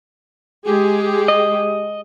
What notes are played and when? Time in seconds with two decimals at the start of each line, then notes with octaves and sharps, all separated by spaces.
0.66 G#3 G4 G#4
1.28 D#5